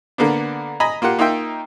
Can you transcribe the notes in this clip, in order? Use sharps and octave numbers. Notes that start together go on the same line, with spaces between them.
D3 A#3 B3 D4
D#5 G#5 A#5 B5
A#3 F4 G4 F#5
A#3 D#4 F4 E5 G5